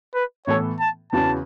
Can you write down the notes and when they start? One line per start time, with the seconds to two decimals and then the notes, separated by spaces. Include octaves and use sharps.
0.14 B4
0.47 A2 E3 B3 A4 C#5
0.80 A5
1.12 E2 C#3 E3 C#4 F#4 A5